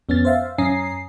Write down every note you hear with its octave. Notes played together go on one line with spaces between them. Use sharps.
F2 B3 C#4 F6 A6
C5 E5 F5
F#2 C#4 G#5 A#5 D#6 C7